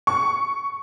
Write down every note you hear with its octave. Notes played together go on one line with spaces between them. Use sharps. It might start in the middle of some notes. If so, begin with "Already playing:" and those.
C#6